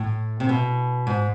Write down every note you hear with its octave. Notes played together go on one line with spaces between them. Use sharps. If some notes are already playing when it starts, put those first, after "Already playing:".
Already playing: A2
C3
B2
G#2